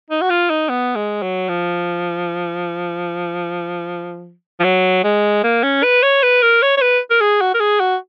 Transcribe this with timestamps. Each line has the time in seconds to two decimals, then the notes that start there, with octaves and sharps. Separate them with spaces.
0.10 D#4
0.21 F#4
0.30 F4
0.50 D#4
0.69 B3
0.96 G#3
1.22 F#3
1.49 F3
4.60 F3
4.64 F#3
5.04 G#3
5.44 A#3
5.63 C#4
5.83 B4
6.03 C#5
6.23 B4
6.42 A#4
6.62 C#5
6.77 C#5
6.82 B4
7.10 A#4
7.21 G#4
7.41 F#4
7.54 A#4
7.60 G#4
7.80 F#4